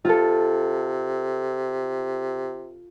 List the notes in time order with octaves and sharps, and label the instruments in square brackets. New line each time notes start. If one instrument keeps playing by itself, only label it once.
[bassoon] C3 [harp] F4 A4